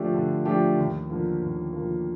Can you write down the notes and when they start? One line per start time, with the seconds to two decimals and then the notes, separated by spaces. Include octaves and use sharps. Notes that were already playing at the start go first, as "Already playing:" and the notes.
Already playing: D3 F3 A3 D4 G4
0.14 D3
0.45 F3 A3 D4 G4
0.78 D#2
1.10 D3 F3 A#3
1.42 D#2
1.73 D3 F3 A#3